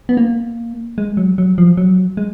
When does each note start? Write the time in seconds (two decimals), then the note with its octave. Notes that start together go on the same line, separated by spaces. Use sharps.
0.09 B3
0.17 A#3
0.98 G#3
1.17 F#3
1.38 F#3
1.58 F3
1.77 F#3
2.17 G#3